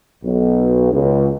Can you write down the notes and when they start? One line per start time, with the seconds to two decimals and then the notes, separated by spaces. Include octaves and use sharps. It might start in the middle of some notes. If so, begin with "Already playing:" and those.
0.23 B1
0.92 C#2